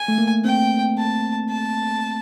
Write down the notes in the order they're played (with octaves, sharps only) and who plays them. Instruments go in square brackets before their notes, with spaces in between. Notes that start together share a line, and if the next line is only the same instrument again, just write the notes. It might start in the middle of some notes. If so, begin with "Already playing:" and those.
Already playing: [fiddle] G#5
[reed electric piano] A3
A#3
[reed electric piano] C4 [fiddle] G5
[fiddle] A5
A5